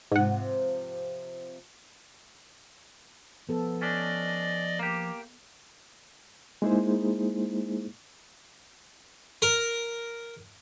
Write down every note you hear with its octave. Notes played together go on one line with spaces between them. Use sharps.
G#2 C3 F3 F#5
F3 B3 A4
C#4 D4 D5 D#5
A#3 G4
G#3 A#3 D#4 E4 G#4 C5
A#4